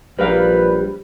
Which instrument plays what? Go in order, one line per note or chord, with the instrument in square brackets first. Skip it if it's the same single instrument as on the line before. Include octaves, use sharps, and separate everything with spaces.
[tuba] A#1 [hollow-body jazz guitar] G3 A#4 F5 [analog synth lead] B4